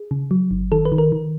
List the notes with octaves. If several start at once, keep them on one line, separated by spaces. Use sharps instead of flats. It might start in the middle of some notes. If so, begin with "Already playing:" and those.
Already playing: G#4
C#3
F#3
G1
D#3 A4
B4
D#3
A#4
D#3